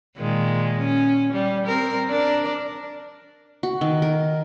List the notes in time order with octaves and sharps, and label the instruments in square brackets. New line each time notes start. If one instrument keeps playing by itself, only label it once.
[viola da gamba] A#2 D#3 G#3
C#4
G3
C4 A#4
D4 A#4
[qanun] F#4
D#3
A#4